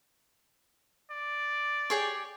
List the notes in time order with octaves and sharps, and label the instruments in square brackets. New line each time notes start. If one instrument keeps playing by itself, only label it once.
[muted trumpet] D5
[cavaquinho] G4 G#4 C#5